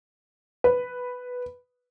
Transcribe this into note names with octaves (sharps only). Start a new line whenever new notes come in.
B4